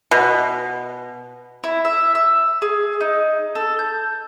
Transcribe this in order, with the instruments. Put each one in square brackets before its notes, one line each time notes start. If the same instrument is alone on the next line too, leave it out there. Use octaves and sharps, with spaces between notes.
[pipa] B2
[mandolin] E4
E5
E6
G#4
D#4
A4
G6